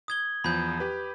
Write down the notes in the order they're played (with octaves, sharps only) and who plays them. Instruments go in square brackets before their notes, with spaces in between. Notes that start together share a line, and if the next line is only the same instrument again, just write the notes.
[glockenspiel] D#6 G#6 G7
[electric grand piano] E2 F3 [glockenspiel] B5 G6
[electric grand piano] G4 B4